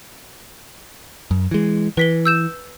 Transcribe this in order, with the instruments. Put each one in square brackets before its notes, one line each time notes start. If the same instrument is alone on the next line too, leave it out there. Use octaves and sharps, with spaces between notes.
[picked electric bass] F#2
E3 G#3
[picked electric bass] E3 [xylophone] B4 B6 G7
[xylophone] E6 G6 E7